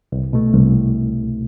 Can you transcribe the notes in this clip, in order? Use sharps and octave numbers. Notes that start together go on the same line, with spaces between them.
C2
B2 A3
C2